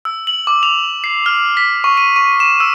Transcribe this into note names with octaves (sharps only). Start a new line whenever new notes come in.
E6
F#7
D6
F7
C7
F6
B6
C#6
D#7
C#6
E7
E6